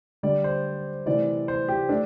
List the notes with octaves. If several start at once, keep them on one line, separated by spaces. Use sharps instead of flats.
D3 G3 D5
C5
C3 E3 A3 D5
C5
G4
A3 D4